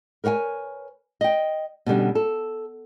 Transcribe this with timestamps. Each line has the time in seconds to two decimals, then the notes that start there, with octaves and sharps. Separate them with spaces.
0.24 A#4 B4 C#5 F5 G#5
1.21 D#5 G5
1.86 B2 D3 G3 C#4
2.15 A4